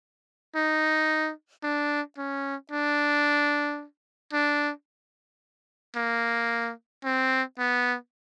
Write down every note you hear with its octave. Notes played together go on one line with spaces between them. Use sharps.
D#4
D4
C#4
D4
D4
A#3
C4
B3